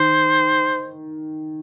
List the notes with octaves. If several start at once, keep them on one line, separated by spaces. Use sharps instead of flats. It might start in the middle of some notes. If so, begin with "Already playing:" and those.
Already playing: D#3 C5